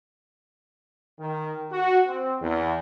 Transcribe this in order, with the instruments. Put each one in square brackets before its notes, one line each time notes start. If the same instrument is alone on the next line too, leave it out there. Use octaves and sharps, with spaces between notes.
[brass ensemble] D#3
F#4
C4
E2